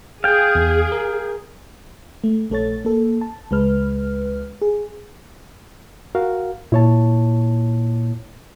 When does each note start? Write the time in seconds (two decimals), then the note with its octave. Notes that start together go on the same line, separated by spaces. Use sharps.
0.24 G#4 F5 G5
0.55 E2
0.92 A#4
2.24 A3
2.50 A#1 A3 A4 C#5 A6
2.85 A#3 A4
3.21 A5
3.51 C#2 G#3 B4 F6
4.62 G#4
6.15 F#4 A#4 F5
6.72 A#2 E4 C#5 A5